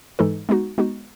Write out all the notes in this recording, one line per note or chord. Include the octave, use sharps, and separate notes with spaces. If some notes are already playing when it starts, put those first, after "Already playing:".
G#2 E3 G#3 D#4 A4
G#3 B3 D#4 F#4
G#3 B3 D#4 F#4